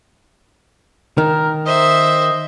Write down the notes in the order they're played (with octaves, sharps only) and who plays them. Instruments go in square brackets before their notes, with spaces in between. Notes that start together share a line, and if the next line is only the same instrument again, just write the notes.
[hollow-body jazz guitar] D#3 [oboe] A#4
[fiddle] C5 E5 [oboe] D#5